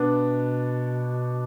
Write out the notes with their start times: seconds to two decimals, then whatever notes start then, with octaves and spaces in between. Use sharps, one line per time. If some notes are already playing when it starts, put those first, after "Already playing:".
Already playing: B2 B3 D4